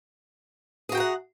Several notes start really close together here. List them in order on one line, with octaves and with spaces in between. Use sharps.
G#4 F#4 G5 A#5 F#5